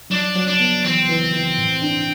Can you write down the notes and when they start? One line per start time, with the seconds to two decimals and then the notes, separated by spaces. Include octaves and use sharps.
0.10 F#3 D4
0.35 F#3
0.47 D4
0.60 B3
0.84 E3 C4
1.09 E3
1.33 E3
1.58 A2
1.82 D4